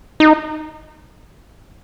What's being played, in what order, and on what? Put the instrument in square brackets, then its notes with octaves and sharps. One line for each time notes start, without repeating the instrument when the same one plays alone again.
[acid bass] D#4